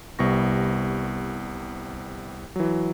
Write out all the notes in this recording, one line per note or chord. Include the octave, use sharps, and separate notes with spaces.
C2 C3 G3 B3 C#6 A#6
E3 F#3